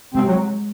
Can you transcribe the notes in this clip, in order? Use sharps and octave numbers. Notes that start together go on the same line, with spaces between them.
C3 G#3 C4
F#3